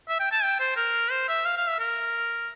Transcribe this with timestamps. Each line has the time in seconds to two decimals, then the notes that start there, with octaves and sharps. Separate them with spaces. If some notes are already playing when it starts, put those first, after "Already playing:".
0.09 E5
0.20 G5
0.31 A5
0.43 G5
0.60 C5
0.76 A#4
1.11 C5
1.28 E5
1.45 F5
1.57 F5
1.68 E5
1.79 A#4